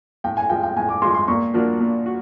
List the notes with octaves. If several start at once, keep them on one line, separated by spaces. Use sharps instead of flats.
A2 G5
G#5
F3 G#3 G5
G5
A2 G#5
D6
F3 G#3 C6
C6
A#2 C#6
F3 A#3 D4 F#4
A#2
F#4